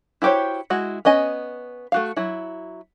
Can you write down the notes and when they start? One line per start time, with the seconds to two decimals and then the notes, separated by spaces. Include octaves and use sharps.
0.22 E4 F#4 G4 C5 C#5
0.70 G#3 E4 F#4
1.05 B3 C#4 D#5 G#5
1.92 A3 F#4 F5
2.16 F#3 E4